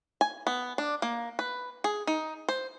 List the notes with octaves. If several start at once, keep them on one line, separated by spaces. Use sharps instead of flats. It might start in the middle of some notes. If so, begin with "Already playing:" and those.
G#5
B3
D4
A#3
B4
G#4
D#4
C5